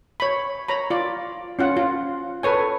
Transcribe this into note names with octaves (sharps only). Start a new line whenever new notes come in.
C#5 B5
C#5 A#5 B5
F4 D5
C#4 F4 F#5
F4
A4 B4 C#5 G#5